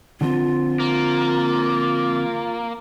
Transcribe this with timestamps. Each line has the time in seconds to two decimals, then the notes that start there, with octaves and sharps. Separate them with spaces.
0.21 D3 F3 C4 F4
0.80 A#3